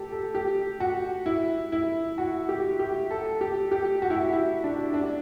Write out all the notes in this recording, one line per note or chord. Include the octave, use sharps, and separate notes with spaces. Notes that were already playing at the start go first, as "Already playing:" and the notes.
Already playing: G4 A4
A4
G4
F#4
E4
E4
F#4
G4
G4
A4
G4
G4
F#4
E4
F#4
E4
D4
D4